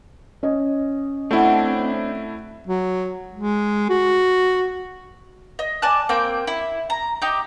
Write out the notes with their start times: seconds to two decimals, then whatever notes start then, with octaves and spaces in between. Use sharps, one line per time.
0.43 C#4 D#5
1.31 A3 C4 D4 E4 F#4
2.67 F#3
3.34 G#3
3.90 F#4
5.59 D#5
5.82 D5 G#5 A5 F#6
6.09 A#3 C4 G5
6.47 E4
6.90 A#5
7.22 D#4 G4